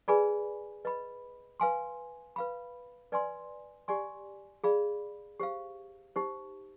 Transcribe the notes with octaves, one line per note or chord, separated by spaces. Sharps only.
G#4 B4 D5 G#5 B5
B4 D#5 B5
B4 F5 G#5 C6
B4 F5 B5
B4 D5 G#5 C6
G4 D5 G#5 C6
G#4 D5 F5 B5
G4 C5 F5
D#4 G4 C5